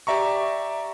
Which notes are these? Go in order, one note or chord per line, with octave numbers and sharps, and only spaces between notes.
G4 D5 E5 A#5 C#6